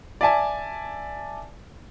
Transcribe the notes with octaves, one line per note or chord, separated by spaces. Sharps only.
D5 E5 G#5 A5